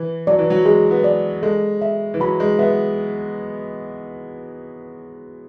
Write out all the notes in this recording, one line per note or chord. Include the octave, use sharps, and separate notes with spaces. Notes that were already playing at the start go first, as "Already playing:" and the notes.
Already playing: E3
F#3 D5
E3
F#3
G#3 G#4
B3
D5
G#3 A4
E5
E3
F#3 B5
G#3
B3 E5